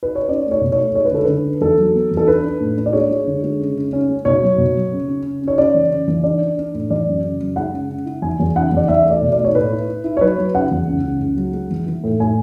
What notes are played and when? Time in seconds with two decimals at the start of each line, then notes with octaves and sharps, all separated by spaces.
0.03 B4
0.15 C#5
0.29 C#4 D5
0.45 A3
0.51 C#5
0.61 B2
0.72 C#5
0.78 A3
0.95 G#3 C#5
1.05 B4
1.11 D3 A4
1.25 D3 B4
1.44 D4
1.61 E2 A4
1.78 F#3
1.94 B3
2.11 E2
2.17 A4
2.27 D4 B4
2.44 D4
2.60 A2
2.77 D4
2.86 D5
2.93 G#3 C#5
3.10 G#3
3.27 D3
3.43 G#3
3.60 C#3
3.77 C#3
3.93 C#4
4.09 G#3
4.25 B2 C#5
4.43 F#3
4.58 B2
4.76 F#3
4.92 C#3
5.08 C#4
5.25 C#3
5.42 C#4
5.48 C#5
5.58 C#3 D5
5.74 E3
5.92 C#3
6.08 E3
6.24 D4 D5
6.41 D4
6.58 D4
6.74 A2
6.90 E3 D5
7.07 F#2
7.23 C#3
7.40 F#2
7.56 G#3 F#5
7.72 C#3
7.90 C#3
8.05 E4
8.22 E2 G#5
8.40 E2
8.56 C#3 F#5
8.72 E2 D5
8.88 E2 E5
9.05 A3
9.10 D5
9.22 B2
9.32 D5
9.39 A3
9.44 C#5
9.54 A2 B4
9.71 E4
9.88 E4
10.04 E4
10.17 C#5
10.21 F#3 B4
10.38 F#3
10.54 C#3 F#5
10.71 E2
10.87 C#2
11.04 C#3
11.20 C#2
11.36 F#3
11.53 G#3
11.71 E3
11.86 E3
12.04 A2
12.20 A2 G#5